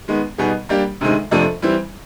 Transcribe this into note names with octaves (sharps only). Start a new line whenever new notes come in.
D#3 G#3 B3
B2 G3 B3 D#4 G#4
G3 A#3 D4 G4
D2 C3 D#3 G#3
F2 C3 F3 A3 D4
E3 G3 C4 E4